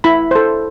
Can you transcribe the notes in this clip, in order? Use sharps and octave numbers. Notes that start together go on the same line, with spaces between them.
E4 B5
A4 C5